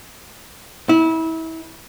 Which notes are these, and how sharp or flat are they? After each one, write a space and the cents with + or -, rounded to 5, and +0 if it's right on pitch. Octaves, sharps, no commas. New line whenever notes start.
E4 -30